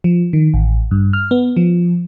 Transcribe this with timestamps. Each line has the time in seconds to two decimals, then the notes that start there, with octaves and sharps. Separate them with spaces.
0.04 F3
0.33 D#3
0.54 A1
0.91 G2
1.13 F6
1.31 B3
1.57 F3